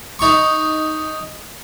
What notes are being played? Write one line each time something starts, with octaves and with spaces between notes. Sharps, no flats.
D#4 C#6